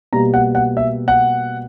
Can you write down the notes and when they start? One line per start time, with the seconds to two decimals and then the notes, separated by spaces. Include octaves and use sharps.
0.13 B2 G3 A#3 A#5
0.34 F#5
0.55 F#5
0.77 E5
1.08 F#5